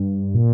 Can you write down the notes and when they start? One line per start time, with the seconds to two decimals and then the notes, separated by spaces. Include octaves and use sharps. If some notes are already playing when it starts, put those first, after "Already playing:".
Already playing: G2
0.34 A#2